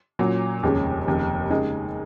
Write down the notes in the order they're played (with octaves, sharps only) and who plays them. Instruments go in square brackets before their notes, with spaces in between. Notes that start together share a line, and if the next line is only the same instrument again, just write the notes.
[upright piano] A#2 F#3 C#4
F1 D#2 C#3 G#3 C#4
F1 D#2 C#3
C#3 G#3 D#4